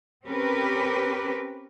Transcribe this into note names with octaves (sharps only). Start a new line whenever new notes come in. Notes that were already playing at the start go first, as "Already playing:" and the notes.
C4 C#4 G4 A#4 B4